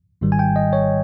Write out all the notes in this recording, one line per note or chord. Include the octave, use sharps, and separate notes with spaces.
G#1 G#2 D#3 G3
G#5
G5
D#5
C#5